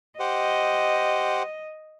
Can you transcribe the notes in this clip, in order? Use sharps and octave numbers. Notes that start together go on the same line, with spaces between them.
G4 C5 D#5 F#5